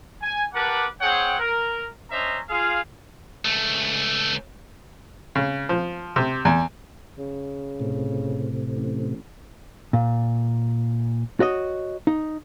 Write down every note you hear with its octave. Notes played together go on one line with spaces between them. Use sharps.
G#5
G4 A#4 B4 F#5 A5 D6
C4 G#4 C#5 F#5 G5
A#4
C#4 D4 C5 D#5 E5 A#5
F4 G#4 F5
C#2 A3
C#3
F3
C3
E2
C#3
A2 C3
A1
A#2
F#4 C#5 D#5
D#4